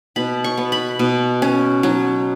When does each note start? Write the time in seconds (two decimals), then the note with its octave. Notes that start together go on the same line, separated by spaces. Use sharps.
0.16 B2 B5
0.44 C#6
0.58 B3
0.72 B5
0.99 B2
1.42 C#4
1.83 F#3